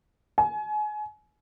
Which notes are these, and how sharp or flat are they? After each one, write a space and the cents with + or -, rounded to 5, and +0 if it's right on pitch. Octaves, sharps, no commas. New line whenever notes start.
G#5 +30